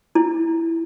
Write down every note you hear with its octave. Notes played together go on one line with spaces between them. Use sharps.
E4